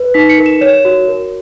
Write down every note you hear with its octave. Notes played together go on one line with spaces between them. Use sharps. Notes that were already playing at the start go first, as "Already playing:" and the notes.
Already playing: B4
D#4 B6
C#7
A#4
E7
C#5 E7
F#4
A#4